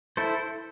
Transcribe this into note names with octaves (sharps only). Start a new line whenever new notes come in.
E4 A4 C5